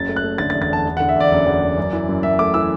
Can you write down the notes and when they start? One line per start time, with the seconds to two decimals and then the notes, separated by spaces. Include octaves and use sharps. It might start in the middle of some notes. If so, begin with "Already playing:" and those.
Already playing: F#1 A6
0.09 A3
0.16 F#6
0.24 A3
0.38 D3 A6
0.50 A6
0.55 E2
0.62 A6
0.70 E2 A5
0.85 E2
0.97 D3 F#5
1.09 E5
1.16 E2 D5
1.31 F#1
1.46 E2
1.62 E2
1.78 F#2
1.93 E3
2.09 F#2
2.23 F#2 E5
2.39 A3 D6
2.54 E3 E6